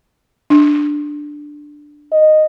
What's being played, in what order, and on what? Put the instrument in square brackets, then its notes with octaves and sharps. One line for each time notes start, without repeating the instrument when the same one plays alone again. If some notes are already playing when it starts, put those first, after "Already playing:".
[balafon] D4
[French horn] D#5